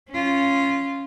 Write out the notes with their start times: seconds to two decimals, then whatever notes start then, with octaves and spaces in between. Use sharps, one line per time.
0.10 C#4 F4